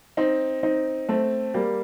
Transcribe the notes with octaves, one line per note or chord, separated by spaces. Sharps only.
C4 D#4
C4 D#4
A3 C4
G3 A#3